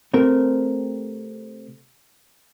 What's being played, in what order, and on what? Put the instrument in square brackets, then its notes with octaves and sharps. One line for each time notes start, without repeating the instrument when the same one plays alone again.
[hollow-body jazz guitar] C3 A3 C4 A#4